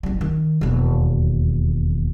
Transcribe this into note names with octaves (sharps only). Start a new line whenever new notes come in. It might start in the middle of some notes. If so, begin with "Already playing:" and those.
F#1 G3
D#3
E1 D#2